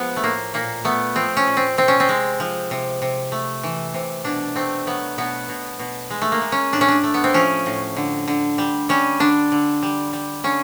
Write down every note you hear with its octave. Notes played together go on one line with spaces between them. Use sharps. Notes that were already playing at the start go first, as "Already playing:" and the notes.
Already playing: F3 G#3 B3
A3
A2 A#3
A#2 A#3
A3 B3
F3 C4
C#4
A#2
C4
C3 C4
C#4
C4
G#3
F3
C3
C3
A3
E3
C3
B2 D4
A3 C4
F#3 B3
B2 B3
B2
B2
G#3
A3
A#3
G#3
C#4
A2 D4
C#4
D4
A3
B3
C4
F3 C#4
A2
D3
D3
G3
G3 C#4
D3 D4
D3
G3
G3
D3 C#4